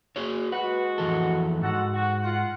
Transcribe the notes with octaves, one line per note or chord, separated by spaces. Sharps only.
F#4 G#4 C#5
G#3 F#4 B4
F2 E3 A4
G#2 F#4 A4 F#5
F#4
F4 F#5